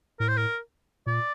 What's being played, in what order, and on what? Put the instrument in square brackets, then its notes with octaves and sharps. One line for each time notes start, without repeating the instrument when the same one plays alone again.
[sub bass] A2 [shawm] A#4
[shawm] C5
A#4
[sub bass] A#2 [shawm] D5